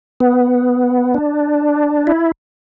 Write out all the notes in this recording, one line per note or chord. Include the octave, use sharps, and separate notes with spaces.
B3
D4
E4